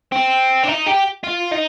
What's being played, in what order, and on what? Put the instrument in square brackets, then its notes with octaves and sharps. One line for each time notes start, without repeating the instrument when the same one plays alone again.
[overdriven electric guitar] C4
D4
D#4
G4
F4
D#4